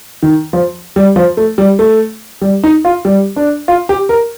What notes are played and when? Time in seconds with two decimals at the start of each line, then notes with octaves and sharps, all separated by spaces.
0.23 D#3
0.53 F3
0.96 G3
1.16 F3
1.37 A3
1.58 G3
1.79 A3
2.42 G3
2.64 D#4
2.85 F4
3.05 G3
3.36 D4
3.68 F4
3.89 G4
4.09 A#4